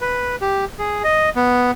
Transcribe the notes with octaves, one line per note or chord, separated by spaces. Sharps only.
B4
G4
G#4
D#5
B3